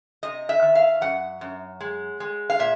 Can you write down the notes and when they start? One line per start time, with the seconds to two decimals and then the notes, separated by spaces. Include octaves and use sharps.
0.23 C3 D#5
0.49 E5
0.62 D#3
0.75 F5
1.01 F#2 F#5
1.41 F#2
1.81 G#3
2.20 G#3
2.50 F5
2.59 A#2 E5